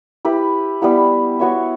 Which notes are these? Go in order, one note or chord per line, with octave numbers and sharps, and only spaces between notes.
E4 G4 B4
G3 B3 E4
B3 F#4 C#5 E5